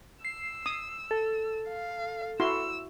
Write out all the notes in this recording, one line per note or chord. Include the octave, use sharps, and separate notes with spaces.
E6 C7
D#6
A4
F5
E4 F#4 C6 E6